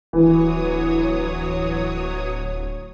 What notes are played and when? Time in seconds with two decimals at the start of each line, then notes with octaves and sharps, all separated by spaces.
0.13 D1 E3 F#3 C#5 D#6